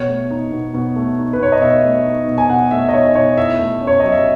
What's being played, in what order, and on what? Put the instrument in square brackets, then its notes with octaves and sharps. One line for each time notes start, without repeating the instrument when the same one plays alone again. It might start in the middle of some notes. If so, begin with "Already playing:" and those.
Already playing: [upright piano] B2 C#5
A3
D#4
B2
B2
A3
D#4
B4
B2 C#5
D#5
B2 E5
A3
D#4
B2
G#5
B2 F#5
A3 E5
D#5
D#4 C#5
B2 C#5
E4 E5
A3
C#4
C#5
F#3 D#5
E5